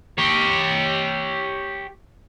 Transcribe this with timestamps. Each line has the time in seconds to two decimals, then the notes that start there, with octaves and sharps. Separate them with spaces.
0.18 G4 C#5